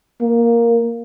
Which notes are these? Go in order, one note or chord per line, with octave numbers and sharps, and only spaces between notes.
A#3